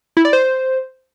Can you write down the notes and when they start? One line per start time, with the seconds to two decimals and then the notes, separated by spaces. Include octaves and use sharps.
0.17 E4
0.25 D5
0.33 C5